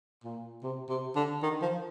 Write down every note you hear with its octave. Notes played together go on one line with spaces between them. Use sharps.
A#2
C3
C3
D3
D#3
F3